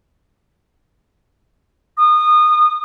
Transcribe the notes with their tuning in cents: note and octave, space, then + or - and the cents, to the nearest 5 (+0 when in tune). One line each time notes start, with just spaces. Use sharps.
D#6 -25